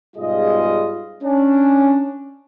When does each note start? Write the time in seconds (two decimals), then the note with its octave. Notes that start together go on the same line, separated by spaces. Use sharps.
0.17 G#2 B2 G3 F4 G#4 D#5
1.23 C#4 D4